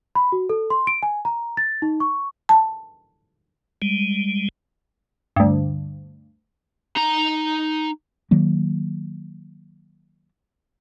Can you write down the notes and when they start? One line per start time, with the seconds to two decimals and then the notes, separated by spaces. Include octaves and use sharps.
0.15 B5
0.32 F#4
0.50 A4
0.70 C6
0.87 D7
1.03 G#5
1.25 A#5
1.57 A6
1.82 D#4
2.00 C#6
2.49 A5
3.82 G3 G#3
5.36 D2 G2
6.97 D#4 A#5
8.31 D#3 F#3 A#3